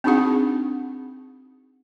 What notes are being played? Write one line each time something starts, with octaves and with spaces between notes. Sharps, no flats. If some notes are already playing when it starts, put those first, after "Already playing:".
C4 D4 D#4 F#4 G#4 F#5